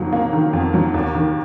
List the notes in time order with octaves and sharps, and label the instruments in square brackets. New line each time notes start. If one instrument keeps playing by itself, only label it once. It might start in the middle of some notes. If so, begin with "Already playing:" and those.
Already playing: [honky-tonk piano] F2 D#3 F#3 A#3
A#3
D#3
F2
F#3
D#2
D#3